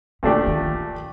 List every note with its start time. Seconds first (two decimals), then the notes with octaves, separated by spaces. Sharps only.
0.23 A#2 D3 A3 D4 G4
0.47 D#3